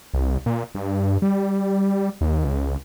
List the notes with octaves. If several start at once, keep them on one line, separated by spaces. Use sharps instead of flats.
C2
A#2
G2
G3
D#2
C#2